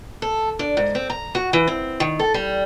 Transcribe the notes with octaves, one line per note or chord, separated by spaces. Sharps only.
A4
D4
G#2
C4
A#5
F#4
E3
C4
D#3
A4
G3